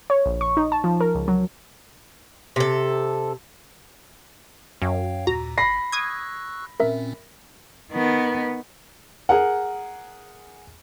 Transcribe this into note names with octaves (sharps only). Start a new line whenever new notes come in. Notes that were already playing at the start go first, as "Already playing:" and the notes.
C#5
A#1
C#6
D#4
A5
F3
A#4
C#2
F#3
C3 A4
F#2 C#5 F5 G5
D#2 A#2 F#4 A#5
G1 B5 A#6 C7
C#6 D#6 E6 F#6 G#6
A#2 C4 C#4 A#4 E5
D#3 B3
G#4 A#4 F#5